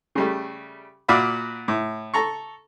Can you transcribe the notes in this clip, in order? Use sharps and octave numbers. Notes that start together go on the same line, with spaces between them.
C#3 G3 A3
A#2 F#4 D5 E5 F5 B5
A2
A4 A#5 C#6